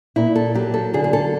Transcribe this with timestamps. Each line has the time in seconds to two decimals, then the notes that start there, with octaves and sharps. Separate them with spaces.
0.16 A#2 E4
0.36 A4
0.54 F#3 G4
0.74 A4
0.94 D3 G#4
1.04 G#4
1.13 A4